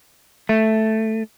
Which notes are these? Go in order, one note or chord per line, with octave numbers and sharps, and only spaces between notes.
A3